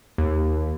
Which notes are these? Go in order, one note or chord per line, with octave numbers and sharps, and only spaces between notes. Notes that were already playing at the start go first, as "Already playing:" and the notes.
D#2